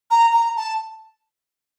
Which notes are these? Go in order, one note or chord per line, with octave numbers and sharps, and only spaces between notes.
A#5
A#5
A5